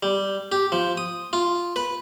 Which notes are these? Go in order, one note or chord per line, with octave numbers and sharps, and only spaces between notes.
G3
G4
F3
D#6
F4
B4